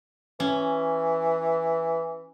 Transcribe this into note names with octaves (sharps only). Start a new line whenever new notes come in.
E3 C#4